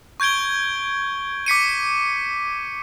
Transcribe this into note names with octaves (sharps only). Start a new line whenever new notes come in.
C#6 G6 G#6 D7 G7
D6 B6 C#7 D#7